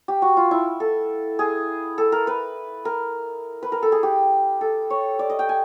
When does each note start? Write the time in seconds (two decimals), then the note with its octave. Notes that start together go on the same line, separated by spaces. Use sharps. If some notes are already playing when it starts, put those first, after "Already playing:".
0.08 G4
0.22 F#4
0.37 F4
0.51 E4
0.80 A4
1.39 G#4
1.98 A4
2.12 A#4
2.27 B4
2.85 A#4
3.63 B4
3.72 A#4
3.82 A4
3.92 G#4
4.03 G4
4.61 A4
4.90 C#5
5.19 D5
5.30 D#5
5.39 G5
5.49 G#5